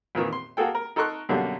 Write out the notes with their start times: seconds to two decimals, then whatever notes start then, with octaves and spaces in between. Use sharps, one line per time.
0.15 F2 A#2 D#3 E3
0.33 C6
0.57 A#3 F#4 G#4 A4 G5
0.75 A#4
0.96 D#4 A4 A#4 C6 C#6 F#6
1.29 F#2 B2 D3 F#3 G3 A#3